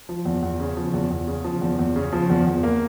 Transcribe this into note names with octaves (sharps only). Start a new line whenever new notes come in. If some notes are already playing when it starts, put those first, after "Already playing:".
F3
E2
E2
C#3
F3
E2
E2
C#3
F3
E2
E2
C#3
F3
E2
E2
A#3